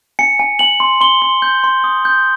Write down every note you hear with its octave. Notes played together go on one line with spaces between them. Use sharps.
G#5 C#7
G#5
G#5 F#7
C6
C6 G7
C6
G6
C6
D#6
G6